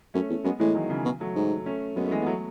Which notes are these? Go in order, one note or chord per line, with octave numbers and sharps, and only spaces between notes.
F#2 A3 C#4
E2
F#2 G#3 B3
A2 E3 G#3
D#3 F#3
C#3 E3
B2
F#3 A3
G#2
A3 C#4
F#2 G#3 B3
A3
E3 G#3
B3
F#3 A3